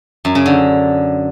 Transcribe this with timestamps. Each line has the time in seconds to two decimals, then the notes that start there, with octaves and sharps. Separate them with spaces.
0.25 F#2
0.35 C#3
0.46 D3